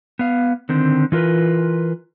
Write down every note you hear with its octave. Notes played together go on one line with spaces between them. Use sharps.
B3 F5
D3 D#3 C4
E3 F4 A#4 B4